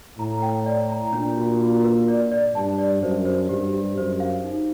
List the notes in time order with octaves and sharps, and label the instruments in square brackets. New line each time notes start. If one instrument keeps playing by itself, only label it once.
[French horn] A2 [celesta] A#5
[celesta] G5
D5
A#5
[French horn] A#2 [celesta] D4
[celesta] F#4
F#4
B4
D5
D5
[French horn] G2 [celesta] A5
[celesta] D5
[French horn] F#2 [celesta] C5
[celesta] C5
[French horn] G2 [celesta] G4
[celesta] G4
[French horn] F#2 [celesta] C5
[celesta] F5
D#4